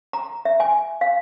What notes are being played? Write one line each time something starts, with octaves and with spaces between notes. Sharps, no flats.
A#5
E5
G#5
F5